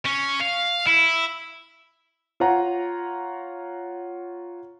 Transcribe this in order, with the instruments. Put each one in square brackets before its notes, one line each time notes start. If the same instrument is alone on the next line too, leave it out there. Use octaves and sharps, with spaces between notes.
[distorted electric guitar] C#4
F5
E4
[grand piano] F4 C#5 F#5 A#5